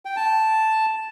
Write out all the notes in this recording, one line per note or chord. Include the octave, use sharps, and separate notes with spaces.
G5
A5